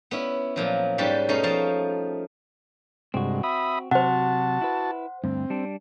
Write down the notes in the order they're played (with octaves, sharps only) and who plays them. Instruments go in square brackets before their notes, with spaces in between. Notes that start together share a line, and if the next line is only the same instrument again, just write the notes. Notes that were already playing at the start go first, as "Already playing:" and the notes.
[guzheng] B3 C#4 E4
A#2 F3 F#3
G#2 G3 C#4 G4 B4 A5
B2 A3 C#4 D#4 D#5 F5
F3 F5 A5
[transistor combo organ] G2 C3 G#3 [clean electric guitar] C4 F#4
[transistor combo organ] E5 B5 D#6
[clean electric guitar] C3 F#3 [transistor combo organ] F#4 A5 [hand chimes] C5 F#5
[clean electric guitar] E4 B4
[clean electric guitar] D2 G2 [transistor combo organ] C4
[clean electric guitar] G3 D4